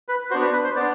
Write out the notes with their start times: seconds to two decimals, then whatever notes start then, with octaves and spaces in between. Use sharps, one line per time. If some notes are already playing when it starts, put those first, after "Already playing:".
0.08 B4
0.30 F#4 C5
0.34 B3 D4
0.42 B4
0.53 B4
0.64 C5
0.76 B3 D4 D5